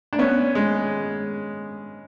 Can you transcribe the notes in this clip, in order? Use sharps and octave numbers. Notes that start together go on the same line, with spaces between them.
D4
B3 C#4
G#3